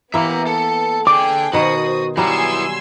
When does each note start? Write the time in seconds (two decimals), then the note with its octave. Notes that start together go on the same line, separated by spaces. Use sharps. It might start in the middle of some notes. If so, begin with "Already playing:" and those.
0.14 E3 A#3 B3 E5 A#5
0.46 A4
1.07 D3 G#4 G5 D6
1.53 B2 D#3 F#4 C5 D#6
2.17 E3 F#3 G3 B3 G#5 C6 E6